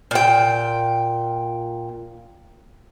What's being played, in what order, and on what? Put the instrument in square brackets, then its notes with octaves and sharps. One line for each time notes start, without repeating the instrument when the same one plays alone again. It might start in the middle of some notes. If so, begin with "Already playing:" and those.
[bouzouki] A#2 G5